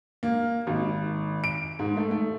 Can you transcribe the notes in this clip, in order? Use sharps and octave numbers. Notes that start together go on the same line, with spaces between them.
A#3
G#1
D7
G#2
A3
A3